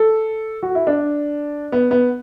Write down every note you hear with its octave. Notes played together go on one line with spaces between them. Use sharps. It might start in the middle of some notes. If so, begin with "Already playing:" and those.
Already playing: A4
F#4
E4
D4
B3
B3